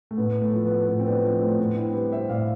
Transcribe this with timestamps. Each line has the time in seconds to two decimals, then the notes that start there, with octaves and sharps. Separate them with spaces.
0.11 A3
0.17 A2 B3
0.42 A3
0.54 F3
0.65 B3
0.88 A2 B3
0.99 C4
1.06 B3 D4
1.24 F3
1.41 A3 C4
1.59 A2 B3 D4
1.76 C4 E4
1.94 G3 G4 B4
2.12 C5 E5
2.29 A2 D5 F5